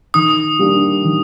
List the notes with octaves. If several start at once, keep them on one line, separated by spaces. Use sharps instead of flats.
D#3 D#6
G3 A#3 D4
D#3